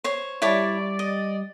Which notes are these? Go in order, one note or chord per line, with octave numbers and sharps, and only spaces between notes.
C5 C#5
G3 E4 C#5 D5 A5
D#5